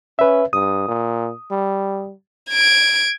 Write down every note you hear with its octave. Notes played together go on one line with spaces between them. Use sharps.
C#4 B4 E5
G2 D#6
A#2
G3
G#6 D7